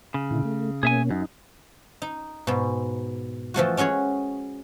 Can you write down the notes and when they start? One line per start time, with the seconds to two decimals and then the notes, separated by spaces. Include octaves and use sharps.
0.14 C#3
0.31 A#2 D3 E4
0.45 A3
0.83 B2 A#3 C#4 G#4 E5 G#5
1.11 F#2 D#4
2.02 D#4
2.47 G#2 B2
3.54 E3 F3 A3 F#4
3.77 G#3 C#4 F#4 G#4 C#5